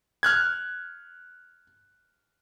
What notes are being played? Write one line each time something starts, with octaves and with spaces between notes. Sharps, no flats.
F6 F#6 G#6